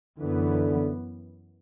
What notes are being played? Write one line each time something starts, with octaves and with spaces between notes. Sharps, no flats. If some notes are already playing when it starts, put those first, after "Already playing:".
F#2 D3 E3 B3